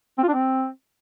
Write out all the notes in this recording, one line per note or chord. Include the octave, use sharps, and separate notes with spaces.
C4
F4
D4
C4